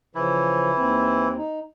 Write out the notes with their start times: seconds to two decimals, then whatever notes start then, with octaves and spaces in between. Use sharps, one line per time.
0.15 C#3 E3 F3 E4
0.77 D#2 C4
1.37 D#4